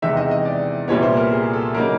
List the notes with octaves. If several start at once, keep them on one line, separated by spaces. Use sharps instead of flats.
E2 C3 D#3 G#3 E5
D#5
D#5
D5
C2 A#2 G3 B3 C#5
C5
A#4
G#4
A4
C#3 F#3 A#3 D#4 A#4